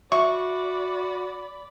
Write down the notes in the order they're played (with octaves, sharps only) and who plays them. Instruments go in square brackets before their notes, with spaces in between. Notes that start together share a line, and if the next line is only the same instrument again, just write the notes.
[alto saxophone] F#4 [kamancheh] D5 B5 [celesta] E5 [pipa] C#6